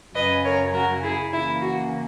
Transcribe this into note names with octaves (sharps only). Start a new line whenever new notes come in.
F#2 C#3 F#3 C#4 B4 D#5
A#4 C#5
F#4 A#4
E4 G#4
C#3 E3 A#3 E4
F#4